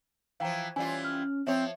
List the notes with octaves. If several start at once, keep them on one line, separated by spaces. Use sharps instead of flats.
E3 F3 F5 G5 A#5
E3 G3 C#4 F4 G#5
F6
F3 C4 C#5 E5